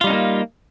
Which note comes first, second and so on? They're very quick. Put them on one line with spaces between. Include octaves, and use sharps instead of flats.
F4 G3 D#4 C#4 A#3